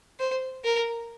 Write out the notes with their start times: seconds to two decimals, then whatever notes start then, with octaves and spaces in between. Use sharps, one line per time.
0.19 C5
0.64 A#4